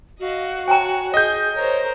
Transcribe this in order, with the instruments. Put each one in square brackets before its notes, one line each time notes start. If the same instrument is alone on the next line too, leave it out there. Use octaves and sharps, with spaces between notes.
[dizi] F#4 [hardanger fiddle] D#5 F5
[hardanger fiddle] C#5 [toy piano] G5 G#5 A#5
[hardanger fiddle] G#4 [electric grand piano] D#5 G6
[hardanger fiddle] A#4 C5 [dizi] C#5